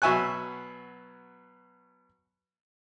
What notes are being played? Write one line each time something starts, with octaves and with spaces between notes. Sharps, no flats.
B2 F#3 E5 G#5 C#6 F#6